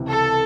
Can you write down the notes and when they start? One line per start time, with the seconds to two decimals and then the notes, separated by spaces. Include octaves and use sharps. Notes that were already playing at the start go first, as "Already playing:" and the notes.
Already playing: C#2 C3 E3
0.10 A4